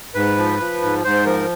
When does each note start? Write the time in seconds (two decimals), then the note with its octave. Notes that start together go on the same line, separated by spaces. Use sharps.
0.15 G#2 B4
0.38 F3
0.59 F3
0.82 G#2
1.04 G#2 C5
1.26 F3 A#4